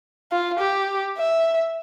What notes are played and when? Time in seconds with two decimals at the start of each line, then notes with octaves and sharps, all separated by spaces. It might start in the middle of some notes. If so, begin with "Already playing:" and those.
0.32 F4
0.59 G4
1.17 E5